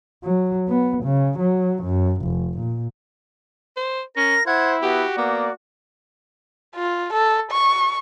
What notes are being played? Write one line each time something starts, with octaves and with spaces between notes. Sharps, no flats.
F#3
B3
C#3
F#3
F#2
F1
A#2
C5
C#4 A#4 A#6
E4 C5 F#5 G#6
B3 F#4 G4
A#3 B3 D5
F4
A4
C#6